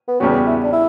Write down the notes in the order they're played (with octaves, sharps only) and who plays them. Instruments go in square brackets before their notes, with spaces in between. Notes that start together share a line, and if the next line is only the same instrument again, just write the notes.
[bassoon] B3
[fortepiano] E2 C#3 G3 B3 F#4 [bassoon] C#4
[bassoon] E4
D4
E4